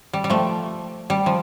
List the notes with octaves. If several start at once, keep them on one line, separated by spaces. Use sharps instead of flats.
G3
G3
F3 A3
G3
F3